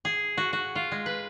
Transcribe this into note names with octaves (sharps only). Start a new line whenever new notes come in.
G#4
F#4
F#4
F4
G#3
B4